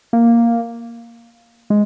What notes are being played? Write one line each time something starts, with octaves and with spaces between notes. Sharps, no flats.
A#3
G#3